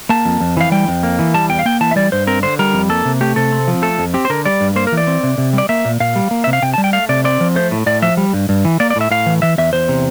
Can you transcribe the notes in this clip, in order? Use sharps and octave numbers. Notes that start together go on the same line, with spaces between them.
A#3 A5
F2
F2
E3 F5
G3 G5
F2
A#3
E3
G3 A5
E2 G5
F5
A#3 G5
E3 A5
E5
G3 D5
G2 C5
C4 A#4
D3 C5
G3 A#4
F2
A#3 A4
C3
A3 G4
C3 A4
C4
F3
A3 A4
F2
C4 G4
C5
D3 A#4
G3 D5
G2
A#3 C5
A#4
E3
D5
C4
C3
C3
G3 D5
A#3 E5
A#2
A#2 F5
G3
A#3
C3 E5
F5
C3 G5
A5
G3
G5
A3 F5
C3 D5
C4 D5
F3
A3 C5
A2
A2 D5
F3 E5
G3
G2
G2
E3
A#3 D5
D5
A2 E5
A2 F5
E3
E3 E5
E2 E5
E2 C5
C3